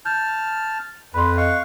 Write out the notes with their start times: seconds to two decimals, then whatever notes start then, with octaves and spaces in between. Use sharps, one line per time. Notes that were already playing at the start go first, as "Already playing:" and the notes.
0.05 A5 F6 G6
1.14 F2 B4 B5 C6
1.37 D#5 F5 C#6 F#6